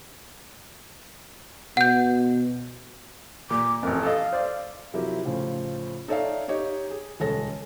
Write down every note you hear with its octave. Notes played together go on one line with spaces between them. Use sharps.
B2 F#5 G6
A#2 D6
A1 F2 A#4
A4 D#5 F5
C5 D5
C3 F3 F#3 E4 G4 A#4
A2 C#3 F3
D#4 A4 C#5 D5 E5 F5
D#4 G4 C#5 D#5
G#4
D#1 C#2 G#3 A4 C#5 A#6